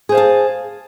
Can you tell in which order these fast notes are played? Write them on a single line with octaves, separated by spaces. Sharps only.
G#4 C5 F5 A5